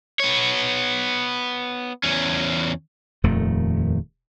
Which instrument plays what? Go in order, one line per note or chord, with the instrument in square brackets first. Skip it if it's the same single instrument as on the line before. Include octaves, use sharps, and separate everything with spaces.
[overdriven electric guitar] B3 C#5
E2 C#4
[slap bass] D#1 F2 D#3 A3